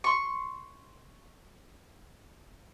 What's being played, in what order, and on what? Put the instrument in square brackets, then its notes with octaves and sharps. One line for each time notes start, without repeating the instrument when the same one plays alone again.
[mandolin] C6 C#6